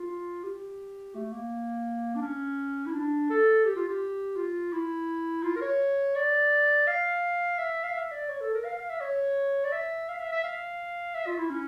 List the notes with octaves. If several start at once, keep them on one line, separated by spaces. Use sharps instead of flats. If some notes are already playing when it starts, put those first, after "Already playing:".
Already playing: F4
G4
A3
A#3
D4
C#4
E4
D4
A4
G4
F4
G4
F4
E4
F4
A#4
C#5
D5
F5
E5
F5
E5
D5
C#5
A4
A#4
F5
F5
E5
C#5
D5
E5
F5
E5
E5
F5
E5
F4
E4
C#4